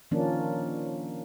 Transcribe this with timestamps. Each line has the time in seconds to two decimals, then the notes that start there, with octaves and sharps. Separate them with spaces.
0.11 D#3 F3 A#3 C#4 D4